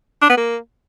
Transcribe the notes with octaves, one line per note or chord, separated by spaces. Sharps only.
D4
B3
A#3